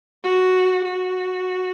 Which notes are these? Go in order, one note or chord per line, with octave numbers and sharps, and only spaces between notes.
F#4
F#4